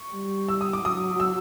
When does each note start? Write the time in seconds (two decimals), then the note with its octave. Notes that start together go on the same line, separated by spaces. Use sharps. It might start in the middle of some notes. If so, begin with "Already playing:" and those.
Already playing: C#6
0.13 G3
0.49 E6
0.61 D#6
0.73 D6
0.85 F#3 D#6
1.20 E6